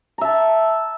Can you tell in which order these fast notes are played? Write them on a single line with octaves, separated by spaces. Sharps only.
A#5 E5 A5